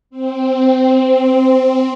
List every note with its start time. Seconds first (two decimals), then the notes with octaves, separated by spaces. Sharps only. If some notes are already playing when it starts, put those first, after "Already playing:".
0.10 C4